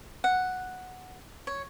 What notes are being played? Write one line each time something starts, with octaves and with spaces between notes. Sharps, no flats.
F#5
C#5